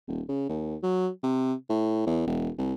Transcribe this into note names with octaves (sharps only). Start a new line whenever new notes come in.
D#1
C#3
D#2
F#3
C3
A2
E2
E1
C2